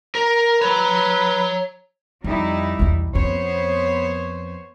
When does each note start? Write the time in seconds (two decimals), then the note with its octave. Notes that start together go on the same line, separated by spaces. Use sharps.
0.15 A#4
0.62 B4 C#5 A#5
2.24 F2 G3 D#4 E4
2.79 B1 E2
3.15 F2 B3 C#4 C5 C#5